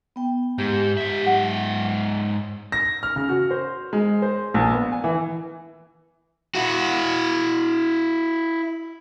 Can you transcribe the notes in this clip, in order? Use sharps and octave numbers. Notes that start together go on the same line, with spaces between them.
B3 G5
G#2 G4
G#2 E5
F#3 F#5
A#6
F6
C#3
F#4
C5
G#3
C5
A#1
B3
G#5
E3
E4 F#4